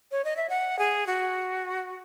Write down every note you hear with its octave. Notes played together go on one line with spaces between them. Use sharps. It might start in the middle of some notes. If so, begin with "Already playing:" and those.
C#5
D#5
E5
F#5
G#4
F#4